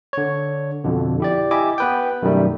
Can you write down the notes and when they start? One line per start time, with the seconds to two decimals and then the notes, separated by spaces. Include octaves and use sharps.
0.13 D3 C#5
0.84 F2 B2 D3
1.20 E4 G4 D5
1.51 E4 G4 D#5 E5 G#5 D6
1.78 B3 B4 G5
2.23 F#2 B2 D#3 G3 A3